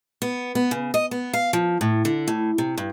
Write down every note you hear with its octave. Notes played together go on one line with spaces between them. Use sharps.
B3
B3
C#3
D#5
B3
F5
F3
A2
D3
A2
C3
G2